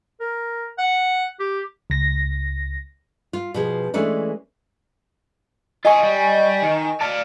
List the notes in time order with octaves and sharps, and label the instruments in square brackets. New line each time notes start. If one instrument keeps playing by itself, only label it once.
[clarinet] A#4
F#5
G4
[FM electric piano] C#2 A#6
[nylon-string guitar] F4
B2 F3 G#4
E3 G#3 A3 C#4 D4
[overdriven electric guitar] F4 G#4 [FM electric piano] D#5 G#5 C#6
[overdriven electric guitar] G3
D#3
[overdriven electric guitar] D5 F5 [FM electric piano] A5